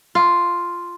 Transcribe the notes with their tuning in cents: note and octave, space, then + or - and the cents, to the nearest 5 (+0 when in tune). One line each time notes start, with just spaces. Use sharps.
F4 +0